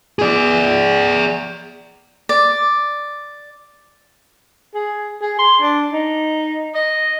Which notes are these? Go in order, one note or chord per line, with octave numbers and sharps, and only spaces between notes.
G#4 D5
D5
G#4
G#4
C6
D4
D#4
D#5